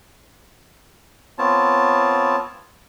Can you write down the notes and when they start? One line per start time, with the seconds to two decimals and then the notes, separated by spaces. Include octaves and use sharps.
1.38 B3 C4 F4 C#5 A5